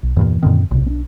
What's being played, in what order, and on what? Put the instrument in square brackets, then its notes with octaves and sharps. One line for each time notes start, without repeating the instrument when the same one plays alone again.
[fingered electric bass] B1
[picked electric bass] E2 G2 A#2 [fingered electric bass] E3 A#3
[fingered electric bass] F#2 C4 [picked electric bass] A#2 D3 D#3
[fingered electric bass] D1 C3 [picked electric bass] B1
[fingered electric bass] C4 D4